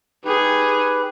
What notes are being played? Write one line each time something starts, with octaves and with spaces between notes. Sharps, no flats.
D#4 G4 G#4 B4